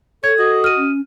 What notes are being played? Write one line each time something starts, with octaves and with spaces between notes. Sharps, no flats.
A4 C#5 G#6
F#4 D#5
F6 D#7
C#4